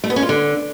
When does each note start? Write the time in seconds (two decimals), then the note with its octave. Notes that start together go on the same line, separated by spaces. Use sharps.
0.04 A3
0.10 B3
0.16 C#4
0.23 F4
0.29 D3